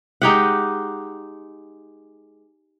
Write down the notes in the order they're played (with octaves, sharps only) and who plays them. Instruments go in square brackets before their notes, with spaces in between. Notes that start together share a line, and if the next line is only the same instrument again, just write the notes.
[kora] G#3 D#4 G4 F#5